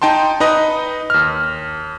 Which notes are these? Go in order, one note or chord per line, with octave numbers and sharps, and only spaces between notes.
D#4 G5 A5 C6
D#4 B4 D#5
D#2 F6